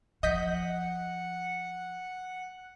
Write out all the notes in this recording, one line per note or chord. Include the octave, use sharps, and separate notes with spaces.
F3 D#5 F#5 G6 B6